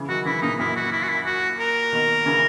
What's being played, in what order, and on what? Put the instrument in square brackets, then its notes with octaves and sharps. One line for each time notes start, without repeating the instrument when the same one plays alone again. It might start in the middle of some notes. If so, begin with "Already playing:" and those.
Already playing: [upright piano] C#3 E3
[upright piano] D#3 F#3 [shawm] F#4
[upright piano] C#3 E3 [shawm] E4
[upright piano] A#2 C#3 [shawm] D#4
[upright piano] F#2 A#2 [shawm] E4
[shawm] F#4
E4
F#4
E4
F#4
A#4
[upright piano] B2 D#3
C#3 E3